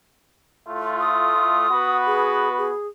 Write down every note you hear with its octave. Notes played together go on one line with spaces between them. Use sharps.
A2 A3 F4
D#6
B3 F#4 B4
G#4
G#4